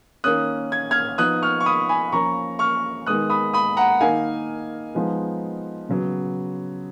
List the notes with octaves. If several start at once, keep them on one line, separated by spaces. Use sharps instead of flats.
D#3 A#3 C#4 D#6 F#6
G#6
F6 G#6
F3 B3 D#4 D#6 F#6
C#6 F6
C#6
B5 D#6
G#5 B5
F3 A#3 C#4 A#5 C#6
C#6 F6
D#3 G#3 B3 D#6 F#6
B5 D#6
B5 D#6
F#5 A#5
D#3 A#3 D#4 F5 G#5
F3 G#3 B3 D#4
C#3 F#3 B3